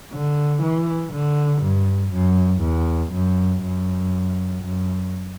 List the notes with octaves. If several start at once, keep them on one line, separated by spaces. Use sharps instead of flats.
D3
E3
D3
G2
F#2
E2
F#2
F#2
F#2